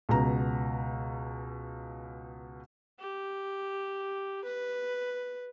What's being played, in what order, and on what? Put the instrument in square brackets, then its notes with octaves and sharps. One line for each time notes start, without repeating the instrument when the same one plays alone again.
[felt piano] C#2 B2 A#5
[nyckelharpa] G4
B4